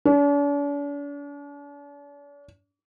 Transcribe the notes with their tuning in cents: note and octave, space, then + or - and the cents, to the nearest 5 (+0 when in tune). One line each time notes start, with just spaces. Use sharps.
D4 -45